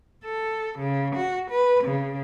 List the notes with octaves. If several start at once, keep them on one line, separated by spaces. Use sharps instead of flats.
A4
C#3
F#4
B4
C#3